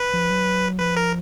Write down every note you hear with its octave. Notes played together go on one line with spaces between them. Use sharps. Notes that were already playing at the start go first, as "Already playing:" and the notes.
Already playing: B4
F3
F#3
F3 B4
A#4